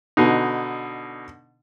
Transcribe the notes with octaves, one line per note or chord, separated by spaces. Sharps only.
B2 D3 D#4